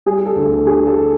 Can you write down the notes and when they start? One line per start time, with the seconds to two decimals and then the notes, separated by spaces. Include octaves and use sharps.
0.06 G3 G#4
0.26 A4
0.36 D2
0.46 A4
0.66 D3 G#4
0.87 A4